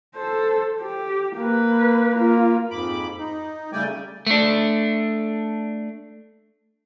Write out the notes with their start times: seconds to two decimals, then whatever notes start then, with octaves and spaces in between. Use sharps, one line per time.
0.15 A4 C5
0.81 G4
1.37 A#3 B4
2.15 A#3 F4
2.71 F2 G#2 B5 D6
3.19 D#4
3.73 C#3 G3 A3 D5 G5 G#5
4.27 A3 D4